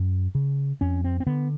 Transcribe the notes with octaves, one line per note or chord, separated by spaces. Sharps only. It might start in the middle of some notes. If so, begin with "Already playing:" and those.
Already playing: F#2
C#3
F2 C#4
C4
C4
D3 B3